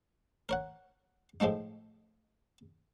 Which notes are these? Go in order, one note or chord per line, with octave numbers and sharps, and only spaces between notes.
A#4 C#5 F#5
A2 F3 G#3 A3 D#4